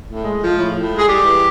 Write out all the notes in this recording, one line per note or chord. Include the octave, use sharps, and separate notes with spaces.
A2
G#3
F3
A2
A2
G#3
G#4
G3 G4
E3